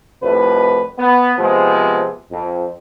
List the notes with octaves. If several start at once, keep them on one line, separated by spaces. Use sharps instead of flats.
C2 F2 A2 B4
B3
C3 F3 G#3 B3
F2